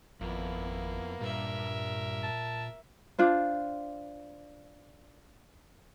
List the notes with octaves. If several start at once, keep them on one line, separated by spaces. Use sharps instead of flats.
G#1 F2 A#3 B3 E4
G2 A#2 A#4 E5
A5
D4 F4 C5